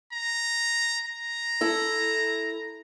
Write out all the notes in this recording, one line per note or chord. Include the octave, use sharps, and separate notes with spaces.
A#5
A#5
E4 A4